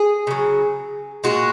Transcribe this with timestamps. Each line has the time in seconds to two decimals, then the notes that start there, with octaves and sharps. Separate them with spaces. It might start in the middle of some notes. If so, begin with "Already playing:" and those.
Already playing: G#4
0.27 C#3 F#3
1.24 A#2 G#3 F#4